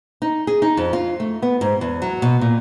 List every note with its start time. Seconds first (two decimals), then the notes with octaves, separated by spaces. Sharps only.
0.22 D#4
0.47 G#4
0.62 D#4
0.77 F2
0.93 F4
1.20 A3
1.42 B3
1.61 G#2
1.81 E2
2.02 F#3
2.22 B2
2.41 A#2